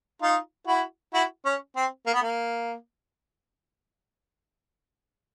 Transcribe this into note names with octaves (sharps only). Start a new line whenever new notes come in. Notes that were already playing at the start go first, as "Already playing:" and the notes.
D#4 F4
E4 F#4
E4 F#4
C#4
C4
A#3
B3
A#3